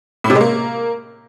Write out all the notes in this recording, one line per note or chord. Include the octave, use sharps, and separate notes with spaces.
A2
C3
G#3
A#3